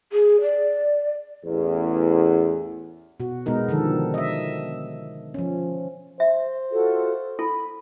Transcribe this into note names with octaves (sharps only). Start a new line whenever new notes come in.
G#4
D5
A1 E2
B2 F#4
B2 G#3 B3 D#4 A#4
D3 D#3 F3 A4
D#5 E5
F3 C#4
C5 E5
F4 F#4 A4
E4 A4 B5